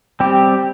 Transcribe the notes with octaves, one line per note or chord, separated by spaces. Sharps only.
G3 C4 G4